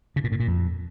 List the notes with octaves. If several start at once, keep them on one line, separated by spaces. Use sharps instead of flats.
C#3
A#2
A2
A#2
F2